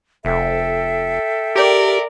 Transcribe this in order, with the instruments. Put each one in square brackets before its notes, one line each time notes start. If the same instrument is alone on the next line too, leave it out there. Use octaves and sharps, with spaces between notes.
[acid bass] F1 [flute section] A4 E5 G5
[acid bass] G4 [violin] A#4 D5